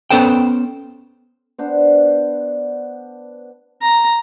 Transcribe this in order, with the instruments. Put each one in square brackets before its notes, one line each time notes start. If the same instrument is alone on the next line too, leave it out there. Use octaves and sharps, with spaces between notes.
[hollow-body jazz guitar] B3 C#4 A4 C5 G5
[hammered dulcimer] B3 D4 C5
[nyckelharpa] A#5